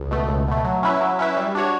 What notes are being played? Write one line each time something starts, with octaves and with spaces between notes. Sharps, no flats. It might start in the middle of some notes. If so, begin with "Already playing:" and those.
Already playing: C#2
B2 A3
C#2
B2 A3
F#3
C#4 E4 B4 E5
F#3
C#4 E4 B4 E5
G3
D4 F#4 C#5